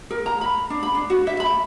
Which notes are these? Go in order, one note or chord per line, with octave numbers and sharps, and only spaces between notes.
A#4
A#5
B5
D4
B5
D4
F#4
E5
B5